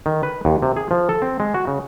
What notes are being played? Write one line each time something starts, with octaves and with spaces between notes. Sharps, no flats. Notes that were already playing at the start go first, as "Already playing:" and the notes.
D#3
B4
D#2
C3
G#4
F3
A4
C4
G#3
F#4
C#3